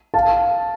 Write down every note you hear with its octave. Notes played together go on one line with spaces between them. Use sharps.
F5 A5